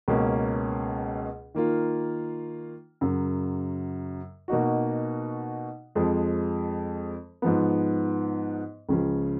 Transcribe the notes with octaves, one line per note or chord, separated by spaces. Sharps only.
C#2 B2 A#3 C#4
D#3 A#3 F4
F#2 C#3 F#3
B2 A#3 D#4 F#4
F2 F3 G#3
G#2 F3 B3
C#2 C#3 F3